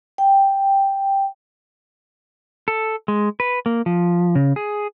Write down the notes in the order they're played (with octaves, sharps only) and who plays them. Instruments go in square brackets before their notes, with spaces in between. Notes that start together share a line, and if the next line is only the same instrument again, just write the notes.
[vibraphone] G5
[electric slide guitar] A4
G#3
B4
A#3
F3
C#3
G#4